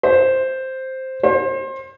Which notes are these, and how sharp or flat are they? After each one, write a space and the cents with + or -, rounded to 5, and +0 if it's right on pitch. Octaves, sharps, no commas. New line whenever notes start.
C5 +0
C5 +30